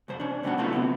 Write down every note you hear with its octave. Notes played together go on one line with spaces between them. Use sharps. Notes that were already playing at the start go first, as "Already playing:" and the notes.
C2 F2 C5
C#4 D4
G#2 C3 F#3 B3 D4 F#5
F#3 A3 B3 E4 F4 A4
C3 B3 C4